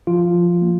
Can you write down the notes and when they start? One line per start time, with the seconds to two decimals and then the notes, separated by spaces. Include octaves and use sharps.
0.07 F3 F4
0.34 F3
0.62 A#3